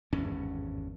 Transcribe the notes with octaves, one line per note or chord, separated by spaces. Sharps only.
G#1 E2 G2 C#4